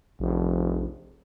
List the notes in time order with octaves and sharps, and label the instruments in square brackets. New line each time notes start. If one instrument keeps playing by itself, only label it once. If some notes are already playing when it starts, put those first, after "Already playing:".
[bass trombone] F1 [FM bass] A#1